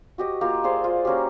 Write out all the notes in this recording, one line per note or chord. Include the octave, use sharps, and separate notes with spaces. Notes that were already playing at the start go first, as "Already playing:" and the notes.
F#4 G4 D#5
A#3 F4 G4 F5
G#4 C5 D5 F5
F4
A#3 C#4 F#4 G4